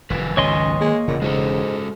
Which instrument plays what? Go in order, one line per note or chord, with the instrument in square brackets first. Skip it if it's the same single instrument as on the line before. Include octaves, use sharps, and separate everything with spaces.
[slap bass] F1 F#2 [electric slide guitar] D#3 B4
[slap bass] G#1 C#2 B2 [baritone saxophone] C#4 [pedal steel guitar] C#5 D#5 C6
[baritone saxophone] G#3 [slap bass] A#3
[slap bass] E1 C#3 [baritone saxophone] A#2
[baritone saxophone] G#2 [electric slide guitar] G#3 F#4 A4